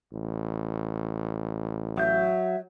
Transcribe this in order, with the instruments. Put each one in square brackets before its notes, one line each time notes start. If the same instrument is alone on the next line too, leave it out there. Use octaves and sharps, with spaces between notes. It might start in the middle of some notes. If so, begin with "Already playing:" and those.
[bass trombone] A1
[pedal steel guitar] F#3 G6 [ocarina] E5